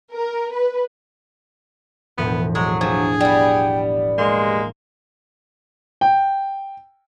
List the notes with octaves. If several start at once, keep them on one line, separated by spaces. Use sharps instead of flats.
A#4
B4
E1 A2 F3 B3
F#3 G#3 G#4
F3 D4 G4 G#4
G3 B3 G5
G#3 A#3 C6
G5